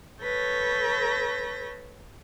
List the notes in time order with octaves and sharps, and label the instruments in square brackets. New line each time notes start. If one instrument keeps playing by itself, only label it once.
[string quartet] A4 B4 C#5 G6 A#6